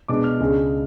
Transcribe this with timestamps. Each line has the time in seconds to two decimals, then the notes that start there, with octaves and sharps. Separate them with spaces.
0.08 B2 G#3 D4 D6
0.24 F6
0.40 C#2 C#3 G#3 D4